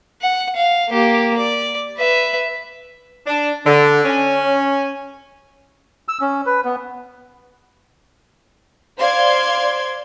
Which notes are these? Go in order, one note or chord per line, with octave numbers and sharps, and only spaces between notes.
F#5
F5
A#3 G4
D5
B4 E5
D4
D3
C#4
E6
C#4
B4
B3
C5 D5 F5 C6 G#6